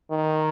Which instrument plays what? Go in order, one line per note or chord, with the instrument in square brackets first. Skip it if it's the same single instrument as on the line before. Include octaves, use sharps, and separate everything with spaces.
[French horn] D#3